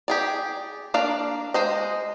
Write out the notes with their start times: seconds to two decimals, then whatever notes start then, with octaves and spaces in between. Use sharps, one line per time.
0.08 G4 G#4 D5
0.94 A#3 D4 D5 F5
1.54 G#3 C5 D#5